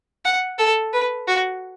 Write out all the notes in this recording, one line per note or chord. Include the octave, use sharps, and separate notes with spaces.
F#5
A4
B4
F#4